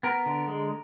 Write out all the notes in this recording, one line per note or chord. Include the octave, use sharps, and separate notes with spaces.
B3 A#4
D3
G#3